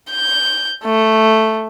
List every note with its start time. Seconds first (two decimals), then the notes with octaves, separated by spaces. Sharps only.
0.11 G6
0.84 A3